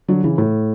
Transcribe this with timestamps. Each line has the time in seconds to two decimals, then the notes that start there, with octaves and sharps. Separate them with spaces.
0.08 D3 F#3
0.24 C#3 E3
0.38 A2